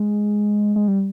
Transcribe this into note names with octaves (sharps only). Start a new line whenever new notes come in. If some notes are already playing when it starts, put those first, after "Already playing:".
Already playing: G#3
G#3
G3